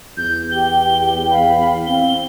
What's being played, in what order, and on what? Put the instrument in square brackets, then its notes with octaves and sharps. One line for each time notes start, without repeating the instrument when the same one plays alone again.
[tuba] E2 [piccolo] G6
[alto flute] G4 [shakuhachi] G5 [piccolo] G7
[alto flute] F5 [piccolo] B5
[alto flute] C4 [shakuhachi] F5 [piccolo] G7